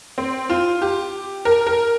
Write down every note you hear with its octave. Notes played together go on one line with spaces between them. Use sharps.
C4
F4
G4
A#4
A#4